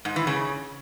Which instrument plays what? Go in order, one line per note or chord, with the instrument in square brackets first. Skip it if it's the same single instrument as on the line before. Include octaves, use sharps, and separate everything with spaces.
[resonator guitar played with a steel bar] G#2
E3
C#3